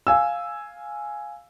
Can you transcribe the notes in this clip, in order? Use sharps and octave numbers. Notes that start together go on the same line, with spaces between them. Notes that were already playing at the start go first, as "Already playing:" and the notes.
F5 G#5 E6